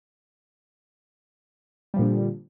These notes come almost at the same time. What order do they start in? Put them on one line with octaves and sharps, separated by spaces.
G3 F3 A#2 D3